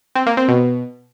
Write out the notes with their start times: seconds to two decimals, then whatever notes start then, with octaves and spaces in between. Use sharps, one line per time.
0.16 C4
0.26 A#3
0.37 C4
0.48 B2